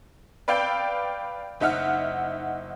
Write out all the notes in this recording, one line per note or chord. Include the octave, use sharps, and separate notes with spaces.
B4 D5 F5 G5 E6 G6
F#1 D#4 E5 F#5 F6